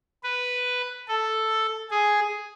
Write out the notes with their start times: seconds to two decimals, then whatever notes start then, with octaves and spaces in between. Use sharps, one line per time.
0.24 B4
1.08 A4
1.91 G#4